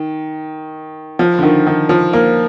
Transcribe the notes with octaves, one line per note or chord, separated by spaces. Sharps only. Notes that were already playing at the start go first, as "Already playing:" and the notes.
Already playing: D#3
F3
D3
D#3
D#3
F3
A#3